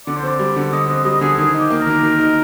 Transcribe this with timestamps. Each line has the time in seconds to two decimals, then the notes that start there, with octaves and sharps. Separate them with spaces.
0.06 D3 D5
0.17 C5
0.23 C4 D5
0.39 G3
0.56 D3
0.72 D3 D#5
0.88 C4 D#5
1.05 G3 D#5
1.21 D3 G#4
1.38 D#3 G#4
1.54 D#4 G4
1.70 A#3
1.81 A#4
1.87 D#3
2.03 D#3
2.19 D#4